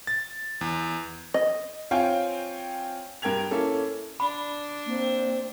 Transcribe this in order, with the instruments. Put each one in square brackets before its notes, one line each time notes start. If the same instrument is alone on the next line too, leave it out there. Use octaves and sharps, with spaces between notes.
[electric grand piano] A6
E2
[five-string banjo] D#5
[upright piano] C4 F4 C#5 F5 G5 G#5
G2 A#4 G5 G#6 F7
A#3 C#4 E4 A4
[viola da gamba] D4 [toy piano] B5
[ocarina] A#3 [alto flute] C4